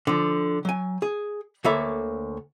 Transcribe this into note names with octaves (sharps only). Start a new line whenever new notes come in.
D3 F3
F#3 G#5
G#4
D2 A#3 A4 C#5 E5 B5